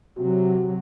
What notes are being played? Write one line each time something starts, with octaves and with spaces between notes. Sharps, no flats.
C3 F#3 F#4